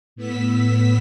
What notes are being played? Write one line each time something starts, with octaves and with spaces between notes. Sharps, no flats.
A2 B3 E6 B6